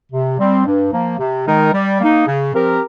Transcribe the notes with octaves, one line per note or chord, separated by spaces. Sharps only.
C3
G3 C4
G2
F3 A#3
C3
D#3 G#3 D#4 A#4
G3
A#3 D#4
C#3
F3 C4 G4 A#4